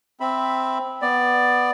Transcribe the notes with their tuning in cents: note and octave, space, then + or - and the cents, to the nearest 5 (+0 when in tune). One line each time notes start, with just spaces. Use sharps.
C4 +0 E5 +0 B5 +0
B3 +0 D5 +10